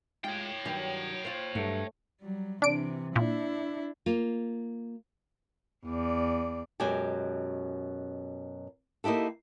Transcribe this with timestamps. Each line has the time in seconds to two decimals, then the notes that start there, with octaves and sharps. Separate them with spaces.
0.24 G#3 F4 G4 C#5 G5
0.65 G2 D#3 F#3 G4
1.25 F4 C5
1.55 G2 F#3 A3
2.22 F#3 G3
2.62 C3 E3 D4 D7
3.16 A#2 D4 E4
4.06 A#3 F4
5.86 E2 D5
6.80 F#2 B2 G#3 G4 G#5
9.04 A#3 D#4 E4 G4 A4